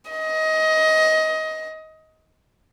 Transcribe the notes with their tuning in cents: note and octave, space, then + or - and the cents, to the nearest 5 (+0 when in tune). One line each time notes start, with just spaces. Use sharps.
D#5 +20